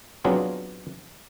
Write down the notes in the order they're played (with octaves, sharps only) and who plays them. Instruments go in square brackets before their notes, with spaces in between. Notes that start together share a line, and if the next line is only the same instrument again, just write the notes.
[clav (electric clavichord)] F#3 B3 C4 D4 F4 G#4